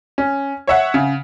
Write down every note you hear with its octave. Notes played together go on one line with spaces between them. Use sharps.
C#4
C#5 E5 F#5
C#3